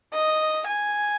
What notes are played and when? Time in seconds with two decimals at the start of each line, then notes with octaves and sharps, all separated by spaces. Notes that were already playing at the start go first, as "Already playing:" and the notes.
0.13 D#5
0.67 G#5